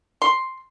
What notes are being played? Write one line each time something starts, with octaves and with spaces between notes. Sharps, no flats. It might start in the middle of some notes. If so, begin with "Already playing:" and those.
C6